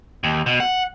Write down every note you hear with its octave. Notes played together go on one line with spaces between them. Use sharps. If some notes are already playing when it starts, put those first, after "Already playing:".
D#2
B2
F#5